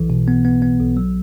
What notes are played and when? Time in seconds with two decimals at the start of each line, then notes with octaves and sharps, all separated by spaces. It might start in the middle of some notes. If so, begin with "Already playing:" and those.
Already playing: B1 E3
0.10 B2
0.28 B3
0.45 B3
0.62 B3
0.79 B1
0.97 F#3